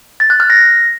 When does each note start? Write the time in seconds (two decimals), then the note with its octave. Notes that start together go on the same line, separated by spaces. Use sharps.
0.20 A6
0.30 F#6
0.40 F6
0.50 A#6